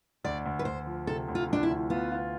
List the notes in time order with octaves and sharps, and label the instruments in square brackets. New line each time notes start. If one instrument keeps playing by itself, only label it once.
[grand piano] D2 [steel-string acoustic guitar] D5
[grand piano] D2
[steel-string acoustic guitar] B4
[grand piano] D2 [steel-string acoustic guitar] C5
[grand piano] F3
[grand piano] C3 [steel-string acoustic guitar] A4
[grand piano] D2
[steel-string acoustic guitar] F4
[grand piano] F3 [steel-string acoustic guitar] D4
[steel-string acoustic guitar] E4
[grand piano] D2
[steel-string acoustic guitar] B3 [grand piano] F4
[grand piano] F4